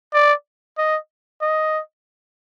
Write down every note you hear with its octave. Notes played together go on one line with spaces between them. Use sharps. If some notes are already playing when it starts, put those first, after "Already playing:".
D5
D#5
D#5